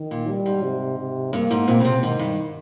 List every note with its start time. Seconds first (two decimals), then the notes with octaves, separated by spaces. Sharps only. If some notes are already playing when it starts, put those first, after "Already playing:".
Already playing: D#3
0.11 A#2
0.28 G3
0.46 G#2
0.63 C3
0.98 C3
1.33 G2 A#3
1.51 G#2
1.68 A#2 C4
1.80 C#3
1.84 C3
2.02 G#2 D#3
2.19 G2